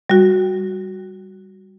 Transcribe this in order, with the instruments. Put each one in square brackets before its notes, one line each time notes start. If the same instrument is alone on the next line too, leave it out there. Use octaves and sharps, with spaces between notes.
[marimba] G3 F#4